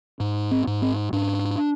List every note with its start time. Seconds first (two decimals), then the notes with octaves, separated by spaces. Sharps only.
0.20 G#2
0.51 C4
0.67 G#2
0.82 C4
1.12 G#2 D4